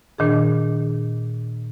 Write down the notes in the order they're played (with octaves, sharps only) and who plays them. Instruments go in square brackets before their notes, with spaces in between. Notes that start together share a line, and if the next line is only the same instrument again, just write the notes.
[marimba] A#2 D#3 D4 G#4